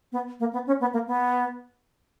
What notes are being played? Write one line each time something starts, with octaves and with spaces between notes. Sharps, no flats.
B3
A#3
B3
C#4
B3
A#3
B3